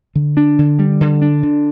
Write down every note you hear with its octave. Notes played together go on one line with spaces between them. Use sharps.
D3
D4
D3
G3
D3
D4
D3